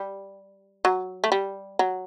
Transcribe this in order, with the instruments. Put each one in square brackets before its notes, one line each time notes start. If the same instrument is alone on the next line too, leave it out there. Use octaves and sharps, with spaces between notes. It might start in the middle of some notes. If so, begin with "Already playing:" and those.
Already playing: [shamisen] G3
F#3
A3
G3
F#3